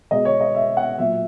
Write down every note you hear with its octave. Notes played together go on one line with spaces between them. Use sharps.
B2 G#3 D#5
C#5
D#5
E5
F#5
A#2 F#3 E5